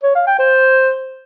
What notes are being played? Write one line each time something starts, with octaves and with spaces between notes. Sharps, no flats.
C#5
F5
G5
C5